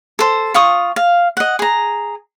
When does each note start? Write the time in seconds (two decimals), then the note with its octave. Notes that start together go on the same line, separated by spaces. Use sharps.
0.19 A4 C5
0.54 F4 C#6 D#6
0.96 F5
1.37 D#5 F#5
1.59 G#4 A#5